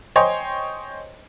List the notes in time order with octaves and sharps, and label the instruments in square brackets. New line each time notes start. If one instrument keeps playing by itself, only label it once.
[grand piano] C5 C#5 D#5 G5 G#5 C6